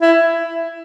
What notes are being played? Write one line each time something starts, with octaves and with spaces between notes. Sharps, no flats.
E4